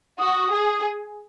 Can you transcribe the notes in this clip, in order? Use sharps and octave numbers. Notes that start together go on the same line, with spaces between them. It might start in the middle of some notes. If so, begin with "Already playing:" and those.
F#4 D#6
G#4